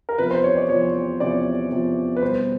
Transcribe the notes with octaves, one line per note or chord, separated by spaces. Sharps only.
A#4
E2 C3 F3 B4
C5
C#5
D5
E2 C3 F3 C#5
E2 C3 F3 D5
E2 C3 F3
B4
B2 G3 B3 C5